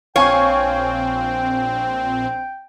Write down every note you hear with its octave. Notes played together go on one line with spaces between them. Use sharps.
A#1 C4 C#5 F5 G5 G#5 C#6